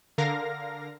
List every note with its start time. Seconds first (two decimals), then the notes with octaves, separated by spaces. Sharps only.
0.18 D3 A#4 F5 A#6